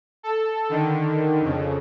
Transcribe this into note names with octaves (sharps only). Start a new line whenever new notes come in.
A4
D3 D#3
F2 C#3